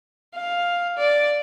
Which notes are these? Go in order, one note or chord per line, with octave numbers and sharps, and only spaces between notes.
F5
D5